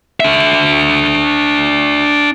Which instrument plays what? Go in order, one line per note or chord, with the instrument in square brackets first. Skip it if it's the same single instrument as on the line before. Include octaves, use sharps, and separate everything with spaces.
[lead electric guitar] D4 E5